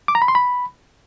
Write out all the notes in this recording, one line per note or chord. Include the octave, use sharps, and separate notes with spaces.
D6
A#5
B5
C6
B5